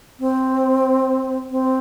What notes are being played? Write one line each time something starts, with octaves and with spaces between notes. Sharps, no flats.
C4
C4